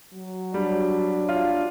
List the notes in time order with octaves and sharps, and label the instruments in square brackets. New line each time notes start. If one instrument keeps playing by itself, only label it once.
[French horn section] F#3
[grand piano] G3 [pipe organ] D4
[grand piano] F4